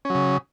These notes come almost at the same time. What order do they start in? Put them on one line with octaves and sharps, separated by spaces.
C#4 F#3 C#3